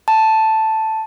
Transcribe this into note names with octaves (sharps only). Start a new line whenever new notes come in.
A5